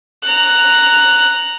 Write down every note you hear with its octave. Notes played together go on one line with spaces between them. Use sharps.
A#5 F#6